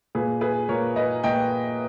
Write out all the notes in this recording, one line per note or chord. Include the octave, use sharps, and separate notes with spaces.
A#2 G#4 B4
G#4 B4
A#2 A#4 C#5
B4 D#5
A#2 D#5 G5